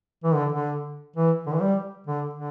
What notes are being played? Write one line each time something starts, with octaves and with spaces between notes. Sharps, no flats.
E3
D3
D3
E3
D3
E3
G3
D3
D3